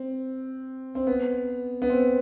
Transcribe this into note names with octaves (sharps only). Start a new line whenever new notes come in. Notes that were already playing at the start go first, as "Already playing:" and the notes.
Already playing: C4
C4
B3
B3
C4